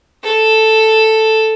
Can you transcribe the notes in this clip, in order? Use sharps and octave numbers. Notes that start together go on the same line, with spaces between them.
A4